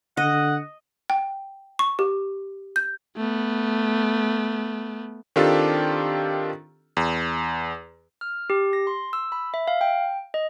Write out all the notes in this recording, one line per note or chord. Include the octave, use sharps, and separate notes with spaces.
D3 D#5 F#5
G5
C#6
G4
G6
A3 B3
D#3 C4 D4 F4 G4 A4
E2
F6
G4
A#6
C6
E6
B5
E5
F5
G5
D#5